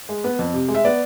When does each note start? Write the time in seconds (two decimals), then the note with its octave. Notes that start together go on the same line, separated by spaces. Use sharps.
0.09 G#3
0.24 B3
0.39 F2
0.54 C3
0.68 G#3
0.75 E5
0.85 B3 D5